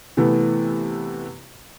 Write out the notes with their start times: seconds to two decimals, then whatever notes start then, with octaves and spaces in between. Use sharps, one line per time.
0.17 C3 E3 A3 B3